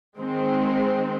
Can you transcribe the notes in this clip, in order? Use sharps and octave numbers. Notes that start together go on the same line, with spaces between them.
D#3 G#3 C4